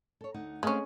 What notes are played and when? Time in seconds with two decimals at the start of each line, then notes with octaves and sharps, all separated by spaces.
0.21 A4 C#5
0.34 D2 D#4 F#5
0.63 G#3 A3 C4 C#4 F5